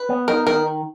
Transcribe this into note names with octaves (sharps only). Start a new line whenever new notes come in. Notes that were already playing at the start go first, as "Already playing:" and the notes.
Already playing: B4
B3
D#4 A#4
D#3 A#4